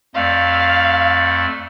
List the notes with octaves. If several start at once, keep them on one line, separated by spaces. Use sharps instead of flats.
F2 A3 D5 F5